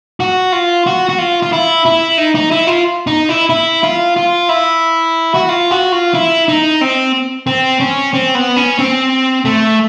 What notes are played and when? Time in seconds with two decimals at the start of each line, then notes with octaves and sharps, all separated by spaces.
0.20 F#4
0.52 F4
0.86 F#4
1.09 F#4
1.18 F4
1.42 F4
1.52 E4
1.86 E4
2.18 D#4
2.35 D#4
2.51 E4
2.67 F4
3.07 D#4
3.29 E4
3.50 E4
3.83 F4
4.17 F4
4.49 E4
5.34 F#4
5.49 F4
5.71 F#4
5.92 F4
6.14 E4
6.48 D#4
6.81 C4
7.47 C4
7.80 C#4
8.13 C4
8.35 B3
8.56 C#4
8.79 C4
9.45 A3